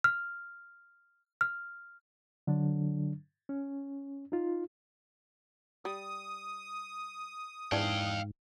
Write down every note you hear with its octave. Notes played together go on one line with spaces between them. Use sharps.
F6
F6
D3 F#3 D4
C#4
D#4 F4
G3 D#6
G#2 E3 D4 F5 G5